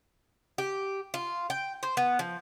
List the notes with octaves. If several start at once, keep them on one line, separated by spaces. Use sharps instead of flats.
G4
F4
G5
C5
B3
F3